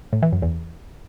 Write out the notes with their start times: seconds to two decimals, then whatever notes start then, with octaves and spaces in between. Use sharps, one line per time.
0.13 A2
0.23 E3
0.32 F#2
0.42 E2